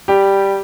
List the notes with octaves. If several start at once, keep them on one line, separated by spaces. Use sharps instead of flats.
G3 G4